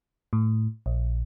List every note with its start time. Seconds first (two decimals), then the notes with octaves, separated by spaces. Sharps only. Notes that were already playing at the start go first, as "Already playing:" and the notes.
0.33 A2
0.86 A#1